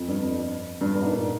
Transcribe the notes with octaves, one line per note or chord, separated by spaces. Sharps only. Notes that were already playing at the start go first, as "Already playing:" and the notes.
Already playing: F2
G2
F2
G2
G2
G#2
A#2